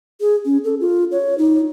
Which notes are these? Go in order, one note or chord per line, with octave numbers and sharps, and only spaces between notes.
G#4
C#4
A4
F4
C#5
D#4